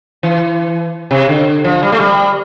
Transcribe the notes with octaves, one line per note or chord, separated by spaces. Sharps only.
E3
C3
D3
F3
G3
A3
G3